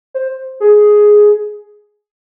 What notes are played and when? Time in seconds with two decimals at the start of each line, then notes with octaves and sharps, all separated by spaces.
0.14 C5
0.60 G#4